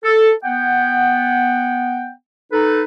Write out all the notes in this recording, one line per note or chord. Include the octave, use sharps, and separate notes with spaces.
A4
B3 F#5 G5
D#4 A4 B4